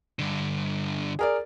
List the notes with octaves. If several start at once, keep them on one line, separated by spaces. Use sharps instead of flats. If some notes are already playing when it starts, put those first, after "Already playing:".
G2 D3
G#4 A#4 D5